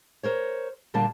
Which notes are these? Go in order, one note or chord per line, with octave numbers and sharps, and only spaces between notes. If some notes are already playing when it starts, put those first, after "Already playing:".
A#4 C5 C#5
A#2 D3 G3 A#3 D4 A5